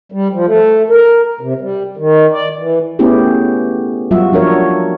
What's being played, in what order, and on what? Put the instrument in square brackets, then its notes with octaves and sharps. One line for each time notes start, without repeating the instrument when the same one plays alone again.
[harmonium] G3
F3
A3
A#4
C3
G3
D#3
D5
E3
[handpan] A3 B3 C#4 E4 G4 G#4
F#3 G3 F4 F#4 E5
F3 D4 A#4 C#5